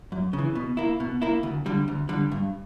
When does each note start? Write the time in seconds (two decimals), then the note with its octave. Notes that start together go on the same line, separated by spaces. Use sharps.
0.12 F#2
0.33 C#3
0.38 E3
0.55 B2
0.77 A#3 E4
1.00 B2
1.22 A#3 E4
1.43 D2
1.66 D3 G3
1.88 D2
2.09 D3 G3
2.32 G2